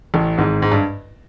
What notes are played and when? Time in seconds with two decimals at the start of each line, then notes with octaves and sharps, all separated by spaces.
0.14 A1 A2
0.38 G#1 G#2
0.62 G#2
0.72 G2